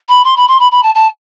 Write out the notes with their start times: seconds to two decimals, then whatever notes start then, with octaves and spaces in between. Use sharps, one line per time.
0.09 B5
0.24 C6
0.36 B5
0.48 C6
0.59 B5
0.71 B5
0.83 A5
0.95 A5